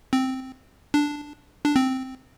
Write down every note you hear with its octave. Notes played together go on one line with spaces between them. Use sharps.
C4
D4
D4
C4